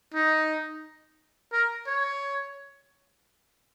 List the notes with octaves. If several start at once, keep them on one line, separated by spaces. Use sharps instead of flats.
D#4
A#4
C#5